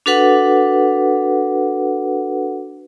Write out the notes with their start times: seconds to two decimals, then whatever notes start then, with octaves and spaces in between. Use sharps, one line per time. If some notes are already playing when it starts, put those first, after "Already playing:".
0.06 D4 F#4 A4 B4 F#5